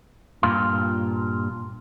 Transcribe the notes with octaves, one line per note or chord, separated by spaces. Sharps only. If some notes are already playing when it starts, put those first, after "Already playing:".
G2 A#2 F4